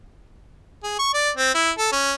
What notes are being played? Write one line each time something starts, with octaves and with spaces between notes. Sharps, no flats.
G#4
C#6
D5
C4
E4
A4
C#4